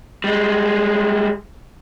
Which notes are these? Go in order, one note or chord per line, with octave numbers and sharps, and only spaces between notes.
G3 G#3